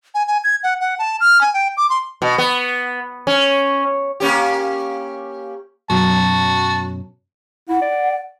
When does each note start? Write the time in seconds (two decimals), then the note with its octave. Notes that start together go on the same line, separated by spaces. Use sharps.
0.14 G#5
0.27 G#5
0.44 G#6
0.63 F#5
0.81 F#5
0.99 A5
1.20 F6
1.41 G#5
1.54 G5
1.77 D6
1.90 C6
2.22 B2
2.38 B3
3.27 C#4
4.20 A#3 C#4 G4
5.90 F#2 B2 F#3 F#4 A5
7.69 E4 F#5
7.81 D5